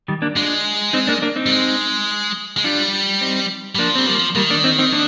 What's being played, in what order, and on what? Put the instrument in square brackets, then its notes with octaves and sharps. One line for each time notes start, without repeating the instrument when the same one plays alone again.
[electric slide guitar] D#3 G3
A#3 D4
[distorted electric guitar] G#3 [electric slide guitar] D4 F4
[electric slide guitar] C4 D#4
A#3 D4
A#3 D4
C4 D#4
[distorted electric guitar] G3
G#3
G#3
[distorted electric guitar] G3 [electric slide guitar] D4 F4
[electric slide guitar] C4 D#4
[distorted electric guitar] G3
[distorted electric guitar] F3 [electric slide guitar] A#3 D4
[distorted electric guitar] G3 [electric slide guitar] C4
[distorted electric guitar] F3 [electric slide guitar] G3 A#3
[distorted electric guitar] D#3 [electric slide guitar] G3 A#3
[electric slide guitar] A#3 D4
C4 D#4
C4 D#4
A#3 D4